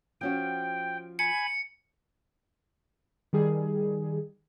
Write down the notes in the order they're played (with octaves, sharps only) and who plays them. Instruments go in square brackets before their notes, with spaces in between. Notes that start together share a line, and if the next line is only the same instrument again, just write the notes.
[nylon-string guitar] F3 C#4 F#4 [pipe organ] G5
[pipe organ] G#5 B5 [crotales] C#7
[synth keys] D#3 G3 G#4